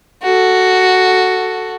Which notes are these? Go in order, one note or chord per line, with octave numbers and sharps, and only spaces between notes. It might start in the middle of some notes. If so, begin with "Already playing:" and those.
F#4 A4